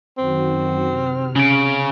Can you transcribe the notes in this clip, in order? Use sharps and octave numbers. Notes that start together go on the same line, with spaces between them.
F#2 D#3 C4 F#4
C3 F6
C#3 C#4 D7